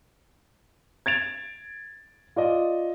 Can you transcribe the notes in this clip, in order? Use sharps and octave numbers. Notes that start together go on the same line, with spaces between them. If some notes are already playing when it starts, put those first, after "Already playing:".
G#6 A6 D7 F7
F4 D5 D#5